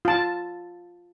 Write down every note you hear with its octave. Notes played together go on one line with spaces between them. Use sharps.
F4 A5